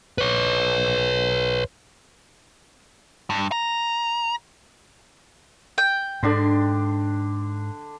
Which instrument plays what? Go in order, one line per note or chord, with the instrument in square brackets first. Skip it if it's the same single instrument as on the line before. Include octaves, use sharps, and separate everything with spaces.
[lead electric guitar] B4 C#5
G2
A#5
[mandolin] G5
[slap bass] G#2 [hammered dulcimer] D3 D4 C6